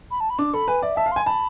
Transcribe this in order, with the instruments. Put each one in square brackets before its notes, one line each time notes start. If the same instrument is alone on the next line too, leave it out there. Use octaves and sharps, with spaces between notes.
[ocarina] B5
A5
B5
[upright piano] D4 [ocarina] D6
[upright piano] A4 [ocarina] B5
[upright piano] B4 [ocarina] G#5
[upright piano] D5 [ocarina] E5
[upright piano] E5 [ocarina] A5
[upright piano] F5
[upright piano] G#5 [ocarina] C6
[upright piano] A5 [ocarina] B5